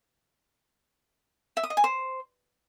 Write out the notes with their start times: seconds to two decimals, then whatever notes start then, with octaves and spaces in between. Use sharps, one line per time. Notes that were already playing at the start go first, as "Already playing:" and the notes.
1.57 E5
1.64 D#6
1.70 D#5
1.77 G#5
1.84 C5